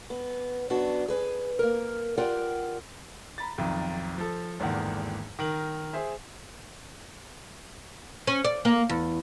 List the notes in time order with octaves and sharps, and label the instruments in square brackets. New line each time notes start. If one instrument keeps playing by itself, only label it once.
[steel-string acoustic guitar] B3
F#2 B3 D4 F#4 A5
G#4 B4 G#5
A#3 A#4
F4 G4 A#4 D5 F#5 G5
[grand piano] A#5 B5 A6
B1 F2 D#3
F3 A4
G#1 E2 D3 D#3 A#3 F#5
D#3 A#4 F#7
G#4 C5 E5 G#5
[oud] C#4
D5
A#3
E2